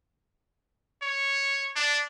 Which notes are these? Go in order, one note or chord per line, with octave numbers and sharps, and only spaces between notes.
C#5
D4